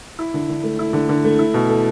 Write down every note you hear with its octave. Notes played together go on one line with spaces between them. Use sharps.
E4
D3
D3
A3
E4
D3
D3
A3
E4
B2
A4